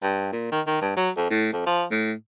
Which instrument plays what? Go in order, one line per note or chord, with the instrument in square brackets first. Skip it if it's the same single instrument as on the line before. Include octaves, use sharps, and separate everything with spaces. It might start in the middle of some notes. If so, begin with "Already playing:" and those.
[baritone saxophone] G2
A#2
D#3
D#3
G2
F#3
F2
A2
F2
F3
A2